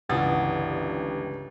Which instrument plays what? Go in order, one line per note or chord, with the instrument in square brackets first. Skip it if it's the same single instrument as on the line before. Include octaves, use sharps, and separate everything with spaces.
[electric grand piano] G1 [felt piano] C#2 E4 D#6 [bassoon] G2 [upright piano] E3 F#5 A6